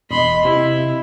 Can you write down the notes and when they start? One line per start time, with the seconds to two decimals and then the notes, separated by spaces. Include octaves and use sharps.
0.11 E1 D#5 B5 C6
0.45 C3 E4